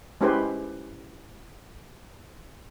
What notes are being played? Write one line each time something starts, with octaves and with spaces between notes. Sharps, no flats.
G#3 C#4 E4 G4 B4 C5